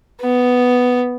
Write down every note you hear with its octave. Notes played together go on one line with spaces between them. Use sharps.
B3